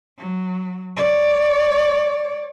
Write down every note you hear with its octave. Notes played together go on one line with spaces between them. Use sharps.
F#3
C#5 D5